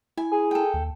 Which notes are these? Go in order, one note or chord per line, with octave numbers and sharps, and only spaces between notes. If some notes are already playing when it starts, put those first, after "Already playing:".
E4 G#5
G#4
A4 G5
D#2